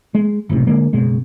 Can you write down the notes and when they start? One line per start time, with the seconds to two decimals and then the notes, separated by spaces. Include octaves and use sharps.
0.15 G#3
0.49 F#1 B1 A2 C3
0.67 D3 G#3 A#3
0.93 F#1 B2 G#3